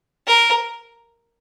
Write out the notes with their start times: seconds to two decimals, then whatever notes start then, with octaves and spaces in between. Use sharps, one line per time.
0.27 A#4